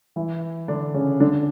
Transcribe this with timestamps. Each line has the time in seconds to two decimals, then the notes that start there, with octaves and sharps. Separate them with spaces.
0.16 E3 E4
0.68 D3 D4
0.94 C#3 C#4
1.20 D3 D4